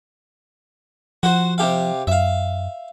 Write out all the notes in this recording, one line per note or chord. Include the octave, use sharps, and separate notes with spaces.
F3 F#4 C5
C3 G4 F5
F#2 E5 F5